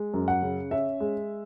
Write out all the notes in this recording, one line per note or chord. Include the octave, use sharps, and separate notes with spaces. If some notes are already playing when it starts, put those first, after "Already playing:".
Already playing: G#3
F#2
F#5
C#3
C#4 E5
G#3